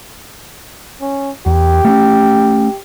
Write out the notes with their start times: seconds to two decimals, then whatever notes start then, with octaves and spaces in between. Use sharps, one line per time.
1.01 C#4
1.46 E2 G4
1.85 A3 B3 C#4